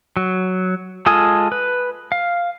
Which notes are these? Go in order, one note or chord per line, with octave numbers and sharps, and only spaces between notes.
F#3
G#3 F4 A4 G#5 D#6
B4
F5